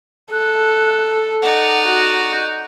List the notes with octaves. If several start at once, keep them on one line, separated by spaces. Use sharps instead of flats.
A4 F#6
D#4 D5 F#5
F#4
G6